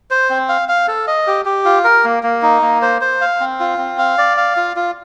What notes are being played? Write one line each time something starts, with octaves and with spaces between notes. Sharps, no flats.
C5
C4
F5
F5
A4
D#5
G4
G4
F4
A#4
A#3
A#3
D#4
A#3
C5
C5
F5
C4
F4
C4
F5
D5
F5
F4
F4